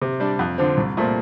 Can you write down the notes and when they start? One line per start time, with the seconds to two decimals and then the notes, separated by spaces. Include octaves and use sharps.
0.02 C3
0.20 G3 D4
0.39 F2
0.58 D3 F3 C4
0.77 C2
0.97 A#2 A3 C4